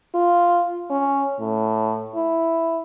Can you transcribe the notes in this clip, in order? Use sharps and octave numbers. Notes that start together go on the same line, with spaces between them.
F4
C#4
A2
E4